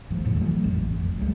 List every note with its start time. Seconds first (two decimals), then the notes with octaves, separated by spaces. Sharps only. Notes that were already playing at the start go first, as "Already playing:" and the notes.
0.10 G#1 D#2 G#2 F3
0.25 G#1 D#2 A2 C#3
0.41 E3 F#3 A3
0.64 A1 F2 G#2
1.00 F1
1.19 C#2 F#3 G#3